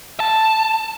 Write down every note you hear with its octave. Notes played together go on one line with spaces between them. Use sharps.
A5